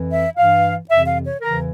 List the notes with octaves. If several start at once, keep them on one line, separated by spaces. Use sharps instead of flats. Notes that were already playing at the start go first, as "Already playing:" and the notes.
Already playing: F2 E3
E5
G2 E3 F5
F2 C3 E3 E5
F5
C#5
E2 C#3 E3 A#4